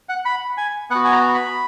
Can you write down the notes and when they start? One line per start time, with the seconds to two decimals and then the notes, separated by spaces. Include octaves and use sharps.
0.09 F#5
0.25 B5
0.58 G#5
0.90 B3 F#5
0.95 F#4
1.05 G#5
1.12 A#5
1.34 B5